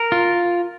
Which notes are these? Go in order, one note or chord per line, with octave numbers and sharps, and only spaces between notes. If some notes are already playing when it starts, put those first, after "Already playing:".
Already playing: A#4
F4